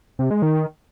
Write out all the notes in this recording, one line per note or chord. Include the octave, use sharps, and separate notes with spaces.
C3
G#3
D#3